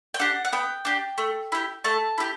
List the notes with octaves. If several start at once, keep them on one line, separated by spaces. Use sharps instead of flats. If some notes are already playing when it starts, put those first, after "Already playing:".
G5
D4 G4 F#5
F#5
B3 G5
D4 G4
A3
E4 G4
A3 A5
E4 G4